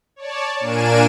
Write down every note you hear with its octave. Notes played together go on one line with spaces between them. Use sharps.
C#5 D5 A5
A#2 A#3 D4 G#5 D7 E7